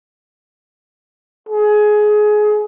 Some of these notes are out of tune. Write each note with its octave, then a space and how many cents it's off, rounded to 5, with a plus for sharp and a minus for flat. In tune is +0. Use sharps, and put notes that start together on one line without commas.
G#4 +20